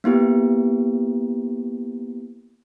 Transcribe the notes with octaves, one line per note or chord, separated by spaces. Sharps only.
A#3 B3 E4 G4